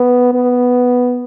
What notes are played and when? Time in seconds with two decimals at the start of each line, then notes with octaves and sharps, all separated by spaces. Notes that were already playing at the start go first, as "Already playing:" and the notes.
Already playing: B3
0.34 B3